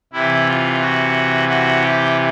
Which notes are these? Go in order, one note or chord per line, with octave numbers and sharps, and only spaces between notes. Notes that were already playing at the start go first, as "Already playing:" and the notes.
C3 E3 E4
F4
F#4
F#4
G4